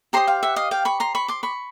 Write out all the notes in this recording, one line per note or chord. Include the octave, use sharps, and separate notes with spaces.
G4 C5 D#5 A#5 C6
F5 G5
E5 F#5
D#5 F5
F5 G5
B5 C#6
A#5 C6
B5 C#6
C6 D6
B5 C#6